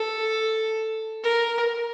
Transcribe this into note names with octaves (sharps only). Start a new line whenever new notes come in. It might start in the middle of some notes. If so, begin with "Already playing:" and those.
Already playing: A4
A#4